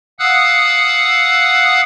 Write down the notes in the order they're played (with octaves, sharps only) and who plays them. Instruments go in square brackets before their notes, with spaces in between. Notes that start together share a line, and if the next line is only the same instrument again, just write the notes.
[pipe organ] F5 F#5 D#6 E6 F#6